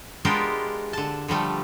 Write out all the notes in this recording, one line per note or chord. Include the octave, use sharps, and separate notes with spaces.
G#3 B3 D4 F4 G4 A#4
D3 A5
D3 F3 G3 A3